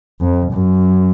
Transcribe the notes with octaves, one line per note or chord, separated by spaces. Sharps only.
F2
F#2